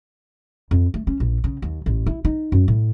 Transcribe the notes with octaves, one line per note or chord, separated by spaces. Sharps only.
F2
A3
C#4
A#1
C#3
D#2
A1
E4
D#4
F#2
A2